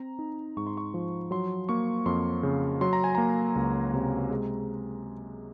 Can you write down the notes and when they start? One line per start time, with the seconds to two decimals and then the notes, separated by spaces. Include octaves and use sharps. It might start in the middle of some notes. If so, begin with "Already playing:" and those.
Already playing: C4 A#5
0.19 D#4
0.57 G#2 C#6
0.67 C6
0.77 C#6
0.94 F3
1.31 F#3 C6
1.69 A#3 C#6
2.06 F2 C6
2.43 C#3
2.81 F#3 C6
2.93 A#5
3.04 G#5
3.15 A#3 A#5
3.56 C#2
3.94 C3
4.31 G#3